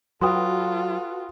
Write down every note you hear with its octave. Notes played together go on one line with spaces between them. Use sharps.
F#3 F4 F#4 A4 B4 G5 C6 D#6